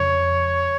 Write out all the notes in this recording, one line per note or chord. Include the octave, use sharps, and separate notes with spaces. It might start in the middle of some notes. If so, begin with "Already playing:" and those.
Already playing: F2 C#3 C#5